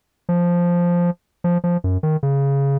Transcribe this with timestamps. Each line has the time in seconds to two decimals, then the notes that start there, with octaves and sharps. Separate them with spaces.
0.29 F3
1.44 F3
1.64 F3
1.84 F#2
2.03 D#3
2.23 C#3